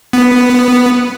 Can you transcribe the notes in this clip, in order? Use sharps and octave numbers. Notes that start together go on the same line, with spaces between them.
B3